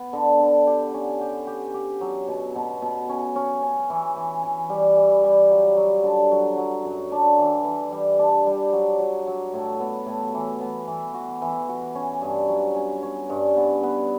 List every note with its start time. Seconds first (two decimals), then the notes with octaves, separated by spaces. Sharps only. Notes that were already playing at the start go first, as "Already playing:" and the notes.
Already playing: B3
0.13 D3
0.40 D3
0.67 G4
0.94 C#4
1.21 G4
1.47 G4
1.74 G4
2.01 F#3
2.28 B2
2.56 B2
2.82 B2
3.09 C#4
3.36 C#4
3.63 C#4
3.90 E3
4.17 E3
4.43 E3
4.70 G3
4.96 E3
5.24 G3
5.51 F#3
5.77 F#3
6.04 D3
6.32 F#3
6.58 F#3
6.84 F#2
7.12 D4
7.39 E3
7.65 E3
7.92 G3
8.19 D4
8.46 G3
8.73 F#3
8.99 F#3
9.27 F#3
9.54 A2
9.80 B3
10.06 A2
10.34 E3
10.61 B3
10.88 E3
11.14 F#4
11.42 E3
11.68 F#4
11.95 C#4
12.22 G2
12.49 F#3
12.76 C#4
13.03 C#4
13.30 G2
13.57 B3
13.83 B3